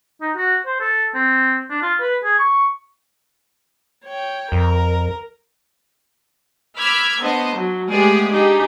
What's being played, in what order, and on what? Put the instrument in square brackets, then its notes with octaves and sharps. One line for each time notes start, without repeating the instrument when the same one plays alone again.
[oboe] D#4
F#4
C5
A4
C4
D4
F4
B4
G#4
C#6
[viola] C#5 G5
[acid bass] F2 [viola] A#4
[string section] B5 D6 E6 F6 G#6 B6
B3 D4 C5 D#5
F#3
G#3 A3 B3 G4 G#4 D5
D4 D#4 G4 G#4